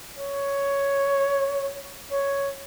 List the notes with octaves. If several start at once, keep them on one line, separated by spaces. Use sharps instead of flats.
C#5
C#5